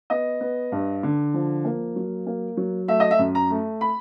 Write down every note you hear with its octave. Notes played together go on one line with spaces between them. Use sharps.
B3 D#5
B3
G2
D3
F3
A#3
F#3
A#3
F#3
A3 E5
D#5
E5
F#2
A#5
A3
B5